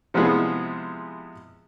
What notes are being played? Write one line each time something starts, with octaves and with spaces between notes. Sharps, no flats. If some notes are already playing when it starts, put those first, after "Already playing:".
C3 F3 G#3 B3 E4 G#4